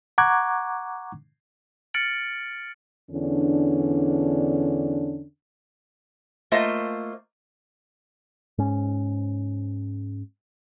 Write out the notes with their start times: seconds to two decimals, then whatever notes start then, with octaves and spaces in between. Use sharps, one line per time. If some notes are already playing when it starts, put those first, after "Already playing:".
0.18 F#5 A#5 C#6 D6 F#6 G#6
1.94 F6 A6 C#7 D7 F#7
3.10 E2 D3 C#4 D4
6.52 A3 A#3 F4 C5 D#5
8.58 G#2 C#4